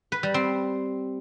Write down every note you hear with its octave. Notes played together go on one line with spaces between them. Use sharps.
B4
G3
C4